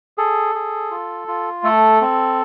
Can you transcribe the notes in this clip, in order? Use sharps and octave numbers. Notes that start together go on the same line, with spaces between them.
G#4 A4
G#4
F4
F4
A3 A4
C4